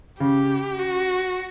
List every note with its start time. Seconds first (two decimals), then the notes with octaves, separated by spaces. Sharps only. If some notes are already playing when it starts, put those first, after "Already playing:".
0.20 C#3 G4
0.79 F#4